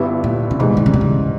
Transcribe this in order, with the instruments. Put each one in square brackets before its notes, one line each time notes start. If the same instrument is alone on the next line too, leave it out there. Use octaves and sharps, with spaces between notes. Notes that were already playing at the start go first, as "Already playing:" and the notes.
Already playing: [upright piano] G1 G2 G3 B3 E4
[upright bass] A#2
C#3
[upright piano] G#2 E3 G3 [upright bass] B2
[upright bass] D#3
C#3
B2
C#3